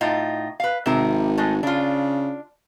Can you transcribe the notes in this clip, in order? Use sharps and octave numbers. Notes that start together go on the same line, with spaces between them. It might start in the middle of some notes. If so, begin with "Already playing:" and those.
A2 D#4 F4
B4 F5
G#1 C3 A#4
G#3 A3
C#3 D4 F4